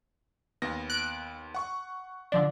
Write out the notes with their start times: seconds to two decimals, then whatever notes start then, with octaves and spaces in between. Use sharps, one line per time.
0.62 D#2 B3 A#6
0.90 F#6 D7
1.54 F#5 C#6
2.32 D3 F3 D4